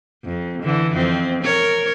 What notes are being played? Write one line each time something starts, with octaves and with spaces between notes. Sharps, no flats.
F2
D3 E3
F2 C4
A#4 C#5